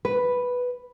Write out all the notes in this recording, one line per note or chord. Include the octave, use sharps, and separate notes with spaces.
B4